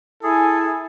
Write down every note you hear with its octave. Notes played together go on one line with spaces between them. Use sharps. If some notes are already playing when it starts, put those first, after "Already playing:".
E4 G#4 A4 G#5